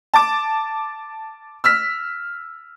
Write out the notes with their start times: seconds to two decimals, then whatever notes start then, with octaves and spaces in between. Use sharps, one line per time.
0.14 A5 D6
1.64 E6 F6 B6